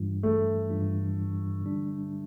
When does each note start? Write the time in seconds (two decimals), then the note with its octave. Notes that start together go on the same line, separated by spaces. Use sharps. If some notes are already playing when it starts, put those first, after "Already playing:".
Already playing: G2 E3 G3 D4 F4
0.23 A3
0.70 G2 E3 G3 D4 F4
1.61 D3 G3 D4